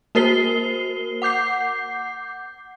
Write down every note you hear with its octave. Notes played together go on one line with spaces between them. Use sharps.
A#3 F#4 A#4 C5 C7 G7
F#5 D6 G6 C7